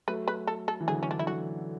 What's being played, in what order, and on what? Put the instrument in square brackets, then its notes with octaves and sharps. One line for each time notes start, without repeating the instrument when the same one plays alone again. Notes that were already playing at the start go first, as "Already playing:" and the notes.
[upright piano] F#3 A3 [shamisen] B4
[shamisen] B4
A4
A4
[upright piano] E3
[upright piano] D3 F#3 [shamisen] G#4
[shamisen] C#4
D4
[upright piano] E3 [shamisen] E4
[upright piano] D3 F#3 [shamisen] F#4